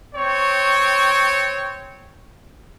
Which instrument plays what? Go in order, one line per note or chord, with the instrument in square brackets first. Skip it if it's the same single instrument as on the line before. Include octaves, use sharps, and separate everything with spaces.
[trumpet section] C4 C#5 C#6